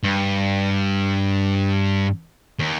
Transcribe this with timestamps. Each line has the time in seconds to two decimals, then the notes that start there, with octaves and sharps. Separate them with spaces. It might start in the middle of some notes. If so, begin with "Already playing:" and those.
0.03 G2
2.59 D#2